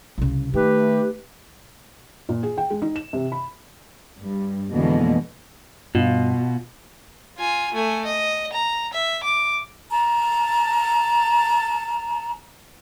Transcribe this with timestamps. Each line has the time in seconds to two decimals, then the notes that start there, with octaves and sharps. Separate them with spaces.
0.18 C2 C#3
0.54 D#3 A3 G4 B4
2.29 A#2
2.43 G#4
2.58 G5
2.70 G#3
2.82 D#4
2.96 E7
3.13 C3
3.32 B5
4.19 G2 G3
4.72 F2 B2 D3 E3 G#3 A#3
5.95 G2 B2 F4
7.38 F4 G#5
7.74 A3 G#5
8.05 D#5
8.52 A#5
8.93 E5
9.23 D6
9.90 A5 A#5